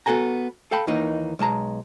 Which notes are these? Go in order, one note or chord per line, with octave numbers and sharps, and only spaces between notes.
B3 F#4 A4 G#5 A#5
A4 F5 G5 A5 B5
D#2 D#3 E3 A#3 D#4
B1 G#3 A5 A#5